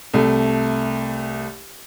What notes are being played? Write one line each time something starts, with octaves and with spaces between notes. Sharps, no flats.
C2 A3